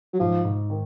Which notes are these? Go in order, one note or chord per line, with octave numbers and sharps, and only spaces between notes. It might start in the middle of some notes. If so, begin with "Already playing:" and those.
F#3
G#2 F3
G#2
D#3